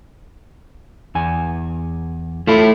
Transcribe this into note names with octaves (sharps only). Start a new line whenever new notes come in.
E2 G#5
A3 E4 F4 A4